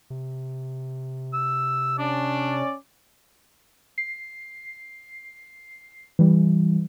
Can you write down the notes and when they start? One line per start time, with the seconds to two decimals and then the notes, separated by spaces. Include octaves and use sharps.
0.10 C3
1.34 E6
1.99 C#4 D4 D5
3.98 C7
6.19 E3 G3